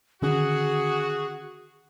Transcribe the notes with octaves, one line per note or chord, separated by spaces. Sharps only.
D3 D#3 C#4 F#4 G#4